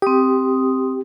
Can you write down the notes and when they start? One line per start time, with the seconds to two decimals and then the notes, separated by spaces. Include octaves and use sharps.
0.02 C4 G4 D#6